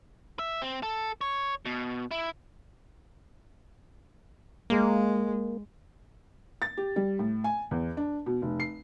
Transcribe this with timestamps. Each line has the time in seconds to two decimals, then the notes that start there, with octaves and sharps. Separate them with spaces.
0.39 E5
0.62 C4
0.83 A4
1.21 C#5
1.65 B2
2.11 E4
4.70 G#3 A#3
6.62 A6
6.77 G4
6.96 G3
7.19 A2
7.44 G#5
7.71 E2
7.97 D4
8.26 B2
8.42 F1
8.60 C7